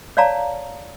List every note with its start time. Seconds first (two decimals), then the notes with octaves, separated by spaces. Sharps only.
0.17 C#5 D5 F5 A5 A#5